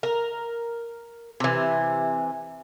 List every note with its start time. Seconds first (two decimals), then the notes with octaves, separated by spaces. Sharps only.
0.03 A#4
1.40 C3 E3